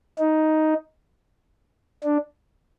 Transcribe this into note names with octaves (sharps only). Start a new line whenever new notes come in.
D#4
D4